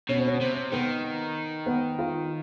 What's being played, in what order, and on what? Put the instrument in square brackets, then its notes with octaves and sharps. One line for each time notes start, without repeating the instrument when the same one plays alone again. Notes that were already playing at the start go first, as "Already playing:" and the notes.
[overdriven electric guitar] B2 [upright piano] C#4
[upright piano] C4
C#4
[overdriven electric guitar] C3 [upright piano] C4
[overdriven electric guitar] D#3 [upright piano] B3
[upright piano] B3
F4